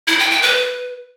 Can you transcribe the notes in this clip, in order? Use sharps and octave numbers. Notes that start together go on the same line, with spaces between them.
E4
G5
G5
B4